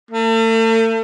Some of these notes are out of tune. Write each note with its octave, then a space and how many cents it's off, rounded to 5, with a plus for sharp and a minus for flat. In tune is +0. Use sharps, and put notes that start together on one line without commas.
A3 +40